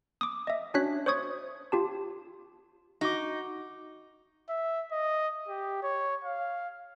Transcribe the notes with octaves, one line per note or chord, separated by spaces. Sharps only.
D6 D#6
D#5 E5
C#4 D4 F#4 C#5 F#6 B6
C5 C#5 C#6 D#6 G#6
F4 G4 A5
D#4 F#4 D6
E5
D#5
G4
C#5
F5